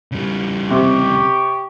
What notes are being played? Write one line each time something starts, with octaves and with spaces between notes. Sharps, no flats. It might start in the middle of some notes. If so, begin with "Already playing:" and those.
C#3 G3
C3 G4 C#6